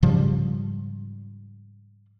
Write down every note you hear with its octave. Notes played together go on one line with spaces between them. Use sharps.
G#2 C#3 F3 G3